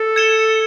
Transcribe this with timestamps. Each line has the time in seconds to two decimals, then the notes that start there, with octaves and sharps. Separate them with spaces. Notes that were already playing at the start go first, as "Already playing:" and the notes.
Already playing: A4
0.16 G#6 C#7 E7 G7